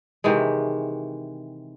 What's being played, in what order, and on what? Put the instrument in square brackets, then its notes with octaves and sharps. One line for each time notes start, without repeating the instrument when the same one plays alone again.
[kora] C3 D#3 E3 G#3